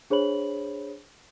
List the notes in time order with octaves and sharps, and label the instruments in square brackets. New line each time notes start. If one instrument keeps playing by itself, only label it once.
[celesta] D4 G#4 C5 C#5 B5 F#7